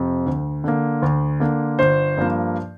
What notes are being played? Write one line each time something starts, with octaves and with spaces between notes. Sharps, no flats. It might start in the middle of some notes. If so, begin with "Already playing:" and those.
Already playing: F2 C3
D2
D3 A#3
D2
D3 A#3
G1 C5
G2 F3 A#3